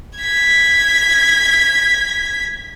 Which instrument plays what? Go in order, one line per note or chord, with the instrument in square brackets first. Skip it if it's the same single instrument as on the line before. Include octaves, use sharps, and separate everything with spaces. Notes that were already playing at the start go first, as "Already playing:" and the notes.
[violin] G#6 B6